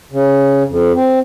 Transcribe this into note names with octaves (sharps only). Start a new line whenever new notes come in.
C#3
F2
C4